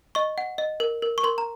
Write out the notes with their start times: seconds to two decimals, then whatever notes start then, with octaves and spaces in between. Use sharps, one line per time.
0.15 D#5 C#6
0.38 F#5
0.58 D#5
0.80 A#4
1.02 A#4
1.18 C#6
1.24 A#4 C6
1.38 A#5